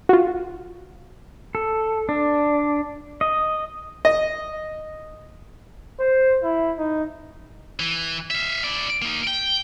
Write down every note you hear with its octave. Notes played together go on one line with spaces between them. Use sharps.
F4 F#4
A4
D4
D#5
D#5
C5
E4
D#4
E3
E5 F5
E4 D5
A#3 D#4
G5